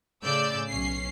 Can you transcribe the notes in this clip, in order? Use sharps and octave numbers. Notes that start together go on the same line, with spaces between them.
A2 C#3 D5 E6 G6
B1 C#4 C7